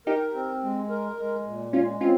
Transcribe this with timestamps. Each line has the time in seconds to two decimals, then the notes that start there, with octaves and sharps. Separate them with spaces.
0.07 D#4 G4 A#4
0.34 C4
0.63 G#3
0.89 A#4
1.18 G#3
1.46 A#2
1.73 G#3 C#4 F4
2.01 C4 C#4 F4